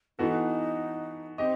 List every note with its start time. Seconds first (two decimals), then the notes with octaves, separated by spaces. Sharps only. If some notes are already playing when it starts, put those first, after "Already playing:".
0.19 E3 B3 D#4 F#4 A4
1.38 C4 D#4 G4 D#5